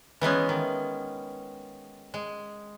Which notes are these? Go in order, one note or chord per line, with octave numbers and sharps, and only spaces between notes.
E3 G#3 B3 C#4
D#3
G#3